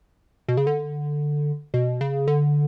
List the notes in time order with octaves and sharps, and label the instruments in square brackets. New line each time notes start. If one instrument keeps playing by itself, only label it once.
[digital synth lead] B2
C#3
D3
B2
C#3
D3